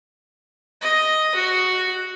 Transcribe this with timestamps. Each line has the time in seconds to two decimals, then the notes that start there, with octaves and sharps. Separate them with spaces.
0.81 D#5
1.35 F#4